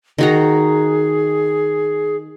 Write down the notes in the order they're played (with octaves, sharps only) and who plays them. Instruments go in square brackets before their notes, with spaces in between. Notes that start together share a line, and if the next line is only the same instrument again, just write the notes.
[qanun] D#3 F#4 A#5 [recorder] G#4